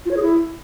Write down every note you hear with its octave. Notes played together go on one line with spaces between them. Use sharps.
F4
C#5
G#4
E4